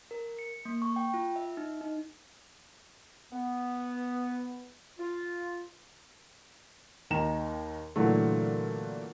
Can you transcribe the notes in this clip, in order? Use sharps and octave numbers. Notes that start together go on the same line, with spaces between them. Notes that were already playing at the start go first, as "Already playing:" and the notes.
A#4
C#7
A#3
C#6
G5
F4
E5
D#4
D#4
B3
F4
D#2 D#3 A#5 E7
A#2 D3 E3 F#3 A3